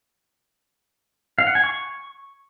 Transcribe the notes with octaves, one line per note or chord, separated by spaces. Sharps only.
F5
F#5
G#5
C#6